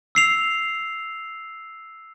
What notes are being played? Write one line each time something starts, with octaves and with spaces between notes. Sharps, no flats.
E6 C7 F7